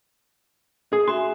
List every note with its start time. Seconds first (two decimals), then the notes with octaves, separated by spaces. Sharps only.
0.93 G#4
1.08 F#4 E5 G#5 C6